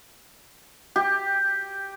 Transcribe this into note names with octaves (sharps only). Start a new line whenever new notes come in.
G4